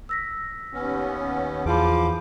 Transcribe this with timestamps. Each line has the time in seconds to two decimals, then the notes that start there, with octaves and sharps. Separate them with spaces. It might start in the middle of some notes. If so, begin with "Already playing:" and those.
0.09 E6 A#6 B6
0.73 D#2 B3 C#4
1.66 E2 E3 F3 G#4 F5 B5 D6